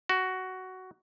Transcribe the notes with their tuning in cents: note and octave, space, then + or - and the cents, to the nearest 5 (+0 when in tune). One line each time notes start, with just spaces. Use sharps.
F#4 +10